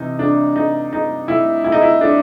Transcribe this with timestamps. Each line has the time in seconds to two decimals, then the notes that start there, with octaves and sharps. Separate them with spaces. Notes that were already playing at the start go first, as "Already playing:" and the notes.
Already playing: C3 E3 D#4
0.19 D4
0.56 D#4
0.93 D#4
1.28 E4
1.64 E4
1.72 D#4
1.81 E4
2.01 D4